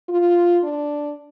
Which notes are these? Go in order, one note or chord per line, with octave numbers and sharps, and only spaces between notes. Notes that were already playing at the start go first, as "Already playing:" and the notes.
F4
D4